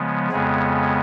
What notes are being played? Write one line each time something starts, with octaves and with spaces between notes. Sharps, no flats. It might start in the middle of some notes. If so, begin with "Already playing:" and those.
Already playing: C#3 F3 G#3 B3
F2 C#3 G#3 B3 G#4